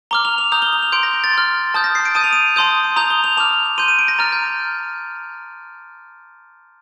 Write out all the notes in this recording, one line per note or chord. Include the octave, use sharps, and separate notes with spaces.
A#5 D6 F6 G7
F7
F7
A#5 D#6 G6 F7
G7
G7
F7
C6 G6 D7
A#6
G6
A6
C6 F6
A5 D#6 G6 A6
A#6
C7
D7
A5 D#6 G6 D#7
F7
D#7
A5 C6 D#6 G6
A#5 D#6 G6 F7
G7
F7
A5 D6 F6 F7
C6 G6 D#7
D#7
D7
A#6
A#5 F6 A6
G6